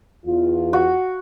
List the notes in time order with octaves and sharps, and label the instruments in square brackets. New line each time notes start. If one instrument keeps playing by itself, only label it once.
[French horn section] E2 F4
[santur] F#4